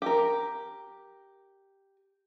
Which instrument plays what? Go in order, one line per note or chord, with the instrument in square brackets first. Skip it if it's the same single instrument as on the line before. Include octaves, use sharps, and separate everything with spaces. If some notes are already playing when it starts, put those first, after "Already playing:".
[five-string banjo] G4 A#4